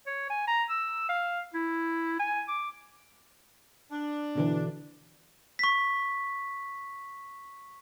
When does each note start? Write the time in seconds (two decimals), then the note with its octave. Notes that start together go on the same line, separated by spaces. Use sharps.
0.07 C#5
0.30 G#5
0.47 A#5
0.69 E6
1.09 F5
1.54 E4
2.20 G#5
2.48 D6
3.91 D4
4.35 B2 D3 E3
5.59 C#6 B6